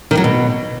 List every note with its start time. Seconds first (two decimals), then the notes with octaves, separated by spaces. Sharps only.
0.11 D#3
0.17 F#3
0.24 B2